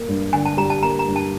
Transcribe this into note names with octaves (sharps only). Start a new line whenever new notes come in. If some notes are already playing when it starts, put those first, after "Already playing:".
Already playing: A#3
G2
D3 G#5
A5
G3 A#5
A5
A#3 A#5
A#5
G2
A5